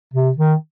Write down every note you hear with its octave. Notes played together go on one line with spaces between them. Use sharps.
C3
D#3